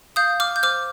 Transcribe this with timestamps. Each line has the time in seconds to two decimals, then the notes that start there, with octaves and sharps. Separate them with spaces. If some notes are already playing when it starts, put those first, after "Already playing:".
0.16 F5 D#6 G6
0.40 D6 F6
0.56 G6
0.63 C5 D6 F6